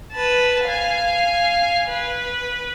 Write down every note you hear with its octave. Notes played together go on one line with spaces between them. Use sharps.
B4 A5
F5 G#5
B4